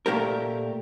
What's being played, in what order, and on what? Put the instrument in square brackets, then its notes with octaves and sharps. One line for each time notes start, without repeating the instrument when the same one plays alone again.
[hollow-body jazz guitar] A#2 A3 G4 A#4